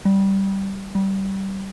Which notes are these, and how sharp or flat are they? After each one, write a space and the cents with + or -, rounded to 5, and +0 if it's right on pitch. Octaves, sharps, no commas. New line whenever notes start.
G3 -10
G3 -20